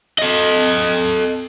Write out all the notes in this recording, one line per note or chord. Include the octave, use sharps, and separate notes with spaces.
A4 D#5